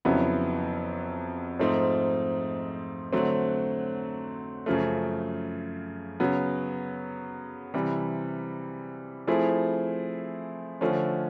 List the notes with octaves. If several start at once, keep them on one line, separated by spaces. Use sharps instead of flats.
F2 C#3 F#3 B3 E4
G#2 F3 A3 C4 D#4
D3 F#3 A3 C4
F#2 C#3 F3 A3
C#3 F#3 B3
C3 E3 G3
F3 A3 C4 E4 G#4
D3 F3 A3 C#4